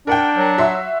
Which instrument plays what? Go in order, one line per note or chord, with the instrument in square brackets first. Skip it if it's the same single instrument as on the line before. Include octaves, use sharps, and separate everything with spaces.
[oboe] D4 [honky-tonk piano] A#4 F#5 G5
[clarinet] F#3
[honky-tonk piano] F#4 E5 C6